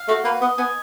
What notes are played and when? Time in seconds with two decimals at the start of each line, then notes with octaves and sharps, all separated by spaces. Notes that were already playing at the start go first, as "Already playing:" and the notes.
Already playing: F5
0.08 A3 F#4
0.24 A#3 B4
0.41 B3 D#5
0.58 B3 G#5